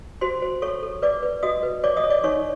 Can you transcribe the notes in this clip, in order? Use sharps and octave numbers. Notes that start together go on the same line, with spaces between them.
F#4 C5 C6
C5
A4 C#5 C#6
A4
B4 D5 D6
B4
F#4 D#5 D#6
B4
C#5 D5 D6
D#5 D#6
C#5
D5 D6
D#4 C#5 C#6